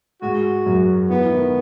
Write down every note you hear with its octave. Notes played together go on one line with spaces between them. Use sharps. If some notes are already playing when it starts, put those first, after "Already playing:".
G#2 G#3 F#4
F#2 F#3
E3 B3
E3
D#3